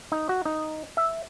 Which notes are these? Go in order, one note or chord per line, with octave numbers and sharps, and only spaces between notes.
D#4
F#4
D#4
E5